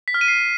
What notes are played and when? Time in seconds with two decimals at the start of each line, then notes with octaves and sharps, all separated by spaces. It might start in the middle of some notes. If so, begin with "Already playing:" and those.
0.08 B6
0.14 F6
0.21 D#7
0.28 C7